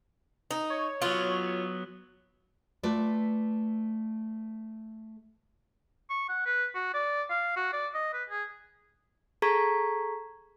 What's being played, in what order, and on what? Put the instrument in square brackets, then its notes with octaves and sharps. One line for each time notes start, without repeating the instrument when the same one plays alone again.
[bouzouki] D#4
[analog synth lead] C#5
[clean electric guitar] F#3 B3 [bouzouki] F4
[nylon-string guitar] A3 F4 B4 D5
[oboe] C#6
F#5
B4
F#4
D5
F5
F#4
D5
D#5
B4
G#4
[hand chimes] G#4 A4 A#5 C#6 G#6 B6